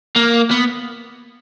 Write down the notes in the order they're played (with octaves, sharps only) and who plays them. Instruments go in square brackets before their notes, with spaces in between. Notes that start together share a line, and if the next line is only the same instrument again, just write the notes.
[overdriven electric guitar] A#3
B3